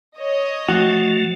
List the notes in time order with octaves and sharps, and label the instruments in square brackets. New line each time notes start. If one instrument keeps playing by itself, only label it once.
[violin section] C#5 D#5
[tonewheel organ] F3 A3 [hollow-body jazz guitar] F#4